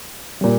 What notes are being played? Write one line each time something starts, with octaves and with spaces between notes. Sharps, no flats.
A#2 G3